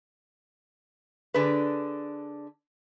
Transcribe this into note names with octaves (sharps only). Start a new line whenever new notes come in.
D3 D4 G#4 B4